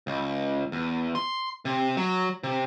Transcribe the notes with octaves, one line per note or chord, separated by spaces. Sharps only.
C#2
E2
C6
C3
F#3
C3